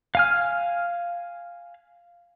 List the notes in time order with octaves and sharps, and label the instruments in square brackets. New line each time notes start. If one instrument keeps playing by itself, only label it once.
[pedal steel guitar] F5 G#5 F6